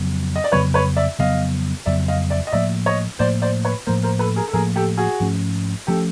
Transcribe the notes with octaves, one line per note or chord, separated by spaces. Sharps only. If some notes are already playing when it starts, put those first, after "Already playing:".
Already playing: F2 C#3 F#3 B3
D#5
D5
F2 C#3 F#3 B3 B4 C#5
B4 C#5
D5 E5
F2 C#3 F#3 B3 D#5 F5
F2 C#3 F#3 B3 D5 E5
D#5 F5
D5 E5
D#5
A2 F3 A#3 D5 E5
C#5 D#5
A2 F3 A#3 C5 D5
C5 D5
B4 C#5
A2 F3 A#3 A#4 C5
A#4 C5
A4 B4
G#4 A#4
A4
A2 F3 A#3 G#4 A#4
G4 A4
F#4 G#4
G#2 F3 A3 C#4
F3 A3 C#4 G4 A4